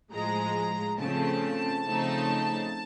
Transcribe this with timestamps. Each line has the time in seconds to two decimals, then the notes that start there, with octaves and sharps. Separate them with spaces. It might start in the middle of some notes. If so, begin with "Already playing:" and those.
0.12 A2 F3 G#3 A#5
0.99 C#3 F3 A3 C4 A5
1.86 C#3 F3 A3 C4 D#4